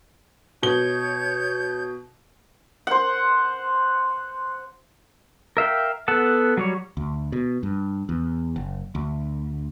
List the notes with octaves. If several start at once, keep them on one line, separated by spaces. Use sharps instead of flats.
B2 C#5 G6 G#6 G7
C5 F#5
A#4 E5 F5 G5
B3 A4 F#5 A5
F#3 G3 C#5
D2
B2
G2
E2
F#1
D2